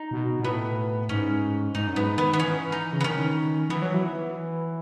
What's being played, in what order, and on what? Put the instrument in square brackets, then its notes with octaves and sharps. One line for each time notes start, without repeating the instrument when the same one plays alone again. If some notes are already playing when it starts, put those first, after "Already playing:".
Already playing: [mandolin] D#4
[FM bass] B2
B2
[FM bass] A2 [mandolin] B3
[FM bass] G#2 [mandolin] C#4
[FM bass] G#2 [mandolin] D#4
[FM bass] F#2
[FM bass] G#2 [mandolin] B3
[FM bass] D#3 [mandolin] B3
[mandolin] B3
[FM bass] E3 [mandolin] C#4
[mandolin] D#4
[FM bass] C#3
[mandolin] B3
[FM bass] D#3 [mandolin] C#4
[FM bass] E3 [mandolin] B3
[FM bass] F#3
E3